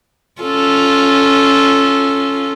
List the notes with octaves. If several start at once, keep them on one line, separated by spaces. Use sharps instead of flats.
C#4 F4 A4